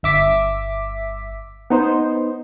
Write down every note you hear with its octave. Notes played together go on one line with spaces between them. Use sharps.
G1 E5 D6 B6
B3 D#4 C5